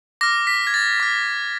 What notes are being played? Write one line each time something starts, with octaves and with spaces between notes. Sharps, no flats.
D6 F6 A#6
B6
G#6
A6
D6 F6